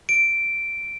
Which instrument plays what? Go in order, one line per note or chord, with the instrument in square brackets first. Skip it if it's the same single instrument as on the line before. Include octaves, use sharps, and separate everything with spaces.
[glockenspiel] D7